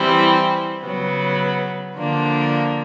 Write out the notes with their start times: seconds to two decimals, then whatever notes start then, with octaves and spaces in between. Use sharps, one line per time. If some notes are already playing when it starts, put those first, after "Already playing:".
Already playing: E3 G3 C4 E4
0.83 C#3 F#3 B3
1.96 D3 F3 A#3 D4